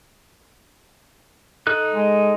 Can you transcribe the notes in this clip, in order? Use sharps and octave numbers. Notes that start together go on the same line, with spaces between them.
D#4 A4 F#6
G#3